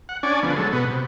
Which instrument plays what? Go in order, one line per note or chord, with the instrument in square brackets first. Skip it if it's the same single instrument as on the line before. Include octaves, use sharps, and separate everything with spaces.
[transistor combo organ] F#5
C#4 D4 D5 G#5
D3 F3 B3
F#3 G#3 A4
B2 B3
C3